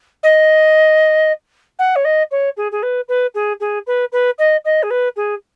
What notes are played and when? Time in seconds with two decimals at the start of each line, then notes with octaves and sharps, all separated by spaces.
0.23 D#5
1.79 F#5
1.96 C#5
2.05 D#5
2.31 C#5
2.57 G#4
2.72 G#4
2.83 B4
3.08 B4
3.34 G#4
3.60 G#4
3.87 B4
4.12 B4
4.38 D#5
4.65 D#5
4.83 G#4
4.90 B4
5.16 G#4